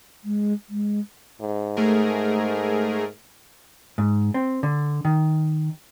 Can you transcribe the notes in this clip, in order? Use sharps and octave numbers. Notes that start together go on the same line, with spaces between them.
G#3
G#3
G#2
A3 G#4 A#4
G#2
C4
D3
D#3